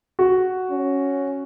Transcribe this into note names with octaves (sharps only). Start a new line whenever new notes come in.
F#4
C#4